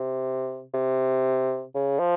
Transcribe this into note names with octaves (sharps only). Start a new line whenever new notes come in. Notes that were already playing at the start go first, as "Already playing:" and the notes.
Already playing: C3
C3
C#3
F3